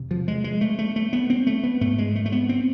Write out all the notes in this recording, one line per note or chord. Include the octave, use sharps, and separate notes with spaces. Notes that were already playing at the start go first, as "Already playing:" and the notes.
Already playing: E2 C3
F3
G#3
G#3
A3
A3
A3
B3
C4
A3
B3
G#2 A3
G#3
A3
A3
B3
C4